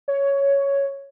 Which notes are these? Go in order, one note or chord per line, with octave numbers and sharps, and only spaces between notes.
C#5